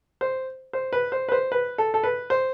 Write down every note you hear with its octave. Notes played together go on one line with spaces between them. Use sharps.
C5
C5
B4
C5
B4
C5
B4
A4
A4
B4
C5